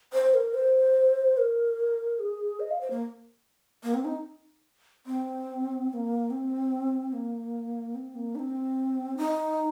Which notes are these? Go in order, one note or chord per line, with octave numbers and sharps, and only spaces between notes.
C5
A#4
C5
A#4
G#4
D#5
F5
C5
A#3
A#3
C4
D#4
C4
C4
A#3
C4
A#3
C4
A#3
D#4
C4
D#4